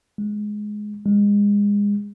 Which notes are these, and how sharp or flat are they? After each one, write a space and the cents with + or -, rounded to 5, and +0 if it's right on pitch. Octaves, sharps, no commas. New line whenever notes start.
G#3 +10
G#3 -30